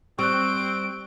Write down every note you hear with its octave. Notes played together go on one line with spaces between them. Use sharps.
G3 C4 C#6 F#6 D7